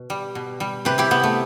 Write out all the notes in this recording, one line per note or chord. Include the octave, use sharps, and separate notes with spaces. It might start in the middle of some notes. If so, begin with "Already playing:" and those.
Already playing: B2
G3
B2
G3
C3 G4 B4
E4 G4
C3 B3
A3